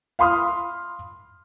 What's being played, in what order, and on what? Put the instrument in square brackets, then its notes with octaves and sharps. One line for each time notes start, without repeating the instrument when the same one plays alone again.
[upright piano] F5 B5 C6 D#6 F6